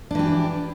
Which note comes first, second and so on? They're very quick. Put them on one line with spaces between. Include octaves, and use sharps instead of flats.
D4 E3 G4